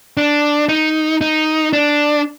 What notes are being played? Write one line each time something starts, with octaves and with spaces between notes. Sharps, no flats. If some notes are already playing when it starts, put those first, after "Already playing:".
D4
D#4
D#4
D4